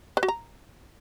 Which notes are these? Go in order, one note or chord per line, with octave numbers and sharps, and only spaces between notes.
B4
F#4
A#5